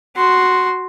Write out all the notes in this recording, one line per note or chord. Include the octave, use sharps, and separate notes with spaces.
F#4 C6